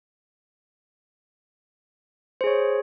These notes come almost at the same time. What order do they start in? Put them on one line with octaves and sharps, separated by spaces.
C5 G#4 C#5